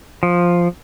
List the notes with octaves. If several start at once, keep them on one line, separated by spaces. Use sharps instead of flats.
F3